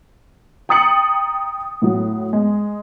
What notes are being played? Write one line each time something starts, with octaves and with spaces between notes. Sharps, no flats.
G5 A#5 D#6 A6 C#7 F#7
A2 F#3
G#3